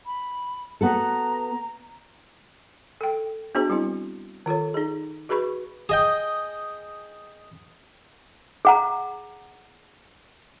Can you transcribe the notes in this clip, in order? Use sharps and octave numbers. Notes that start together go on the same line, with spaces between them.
B5
B3 F#4 A4 A#5
A4 G5
B3 D4 F#4 G#4 C5
G3 C4 E4
D#3 F4 A4 C#5
D#4 G#4
F#4 G#4 B4 B5 C#6
G#4 D#5 G5
G#4 F#5 A#5